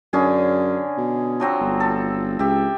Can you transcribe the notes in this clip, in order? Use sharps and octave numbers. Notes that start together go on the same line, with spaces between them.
F#2 D3 C#4 G#4
B2
F3 F#3 C4
G1
A4
C#2 G4 E5